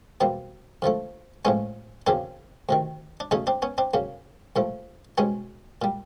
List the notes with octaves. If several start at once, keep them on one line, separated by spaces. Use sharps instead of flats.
E2 B2 G3 A#3 C4
F2 D3 F3 A3
A2 F3 G#3 B3 C#4
E2 C#3 F#3 A#3 C4 D4
D2 C3 D#3
D4
E2 C#3 F#3 A3 C#4 D#4
C4 D4
B3 C#4
C4 D4
F#2 C#3 F#3 A#3
C2 A#2 F3 A3
C2 B2 G#3 B3 C#4
A#2 G3